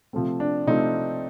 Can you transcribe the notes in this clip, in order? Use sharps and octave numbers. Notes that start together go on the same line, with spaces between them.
C3 F3 A3 C4
D4
C3 F3 A3 C4 D#4